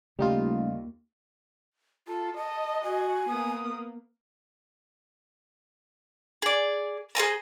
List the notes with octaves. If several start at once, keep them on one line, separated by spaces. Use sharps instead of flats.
D#2 C#3 G3 A3 D#4 F4
F4 A4
D#5 A5
F#4 G#5
A#3 B3 D#6
G#4 D5
G#4 C5 G#5 A#5